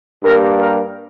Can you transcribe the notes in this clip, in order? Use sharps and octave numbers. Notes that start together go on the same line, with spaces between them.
G2 G3 A#3 A#4
A#4